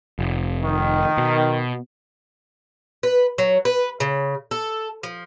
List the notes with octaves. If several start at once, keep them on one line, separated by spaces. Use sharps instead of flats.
F1
D#3
B2
B4
F#3
B4
C#3
A4
F3